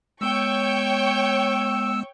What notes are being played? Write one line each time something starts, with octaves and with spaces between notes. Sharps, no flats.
G#3 B3 C#5 G5 C#6 E6